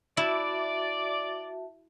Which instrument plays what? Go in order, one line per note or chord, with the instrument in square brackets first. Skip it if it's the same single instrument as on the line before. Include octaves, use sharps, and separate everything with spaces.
[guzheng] E4 [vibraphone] F#4 E5 A5 [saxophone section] D5